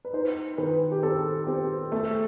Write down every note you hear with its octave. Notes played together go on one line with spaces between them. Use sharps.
B4
D#4 C5
D#3 B4
G4
C4 A4
C4 G4
A3 A4